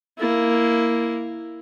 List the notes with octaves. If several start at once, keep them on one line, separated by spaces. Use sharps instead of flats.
A#3 E4